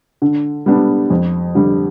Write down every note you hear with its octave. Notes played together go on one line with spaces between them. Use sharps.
D3
G3 B3 D4
F2
D3 G3